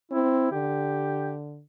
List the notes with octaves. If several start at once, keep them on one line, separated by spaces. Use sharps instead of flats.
C4 E4
D3 G4